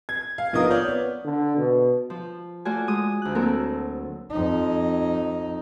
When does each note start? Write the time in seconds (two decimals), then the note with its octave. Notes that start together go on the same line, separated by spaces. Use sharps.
0.09 G#6
0.38 F5
0.53 A#1 B3 D#4 F4 A#4 D#6
0.70 C#5 D5 F6 G6
0.88 B3
1.24 D3
1.57 B2
2.10 F3
2.65 A3 F4 F#4 D5 G#5
2.88 G#3 D#6
3.22 D2 F#6
3.35 F#3 A#3 C4 A4 A#4
4.30 F2 D#4